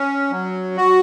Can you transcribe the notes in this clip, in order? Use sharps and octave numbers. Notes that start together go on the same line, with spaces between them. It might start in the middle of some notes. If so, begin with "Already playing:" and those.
Already playing: C#4
F#3
F#4